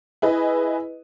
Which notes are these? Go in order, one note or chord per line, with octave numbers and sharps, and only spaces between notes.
E4 G#4 B4 D#5